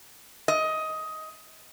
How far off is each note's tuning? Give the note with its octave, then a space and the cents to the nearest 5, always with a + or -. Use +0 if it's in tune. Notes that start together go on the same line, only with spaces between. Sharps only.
D#5 +15